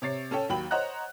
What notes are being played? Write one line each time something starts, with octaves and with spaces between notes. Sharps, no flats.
C3 C#5 A6 C7
C#4 A4 C#5 G5
D#2 F#3 G5 B5 F#7
C5 C#5 D#5 F#5 A#5 F#6